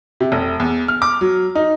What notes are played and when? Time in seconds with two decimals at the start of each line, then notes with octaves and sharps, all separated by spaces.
0.20 C3
0.32 F1
0.60 E2
0.88 F6
1.02 D6
1.21 F#3
1.55 D#4